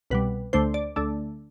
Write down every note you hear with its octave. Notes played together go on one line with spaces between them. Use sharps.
C2 B2 G3 B4
D2 D3 A3 D4 C5
D5
D2 D3 A3 D4